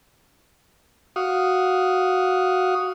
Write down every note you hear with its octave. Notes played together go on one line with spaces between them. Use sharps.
F#4 F5 D#6